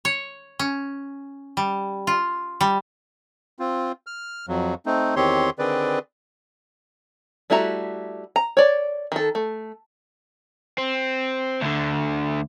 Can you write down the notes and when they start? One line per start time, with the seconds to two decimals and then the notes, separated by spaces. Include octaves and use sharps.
0.05 C#5
0.59 C#4
1.57 G3
2.07 F4
2.61 G3
3.59 C4 F4
4.07 F6
4.48 F2 F#3
4.86 A3 C4 D#4
5.16 E2 D#3 C4 G4 C#5 C6
5.59 D3 D#3 C4 G#4 B4 D5
7.50 G3 A3 E4 F#4 A#5
8.36 A#5
8.57 C#5 D5
9.12 D#3 A4
9.35 A3
10.78 C4
11.61 D2 D3